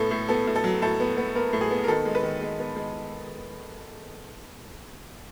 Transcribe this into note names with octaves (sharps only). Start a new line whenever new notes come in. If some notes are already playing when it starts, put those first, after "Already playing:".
Already playing: A2 B3 A4
A2
B3 A4
A2
A4
F#3
A2 A4
B3
B3
B3 A#4
A2
G#4
B3
A#4
D#3 A4
G#3
B4
D#3
G#3
B3
G#3